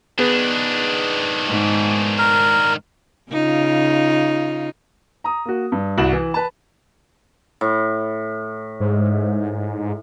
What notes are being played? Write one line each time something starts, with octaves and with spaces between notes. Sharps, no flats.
D#3 B3 D4 G#4 B4
G#2 G#3
A#4
C#3 D#4 F4
A#5 D#6
A#3 F#4
G2
C2 F#4 E7 F#7
E3
B4 A5
A2
G#2